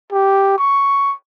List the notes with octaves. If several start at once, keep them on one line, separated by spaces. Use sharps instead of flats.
G4
C#6